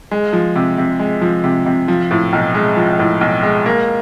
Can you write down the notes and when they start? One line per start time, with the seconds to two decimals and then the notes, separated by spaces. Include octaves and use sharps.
0.11 G#3
0.33 F3
0.56 C3
0.78 C3
0.99 G#3
1.22 F3
1.44 C3
1.66 C3
1.88 F3
2.11 A2
2.33 B1
2.55 G#3
2.77 F3
2.99 A2
3.21 B1
3.43 G#3
3.66 A#3